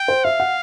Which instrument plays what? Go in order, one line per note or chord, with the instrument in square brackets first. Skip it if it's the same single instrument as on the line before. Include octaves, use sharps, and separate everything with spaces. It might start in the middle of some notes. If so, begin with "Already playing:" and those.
Already playing: [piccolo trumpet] G5
[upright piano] C5
[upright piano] E5 [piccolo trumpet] F5
[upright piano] F#5